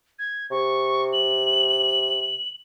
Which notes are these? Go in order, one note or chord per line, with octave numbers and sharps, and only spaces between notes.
G#6
C3 C#6
F#7